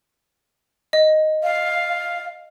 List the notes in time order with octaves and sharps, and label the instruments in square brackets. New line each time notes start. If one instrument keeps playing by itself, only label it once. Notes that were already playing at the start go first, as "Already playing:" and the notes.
[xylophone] D#5
[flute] F5